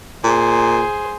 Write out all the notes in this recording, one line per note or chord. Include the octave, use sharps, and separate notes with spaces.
A#2 G#4 C5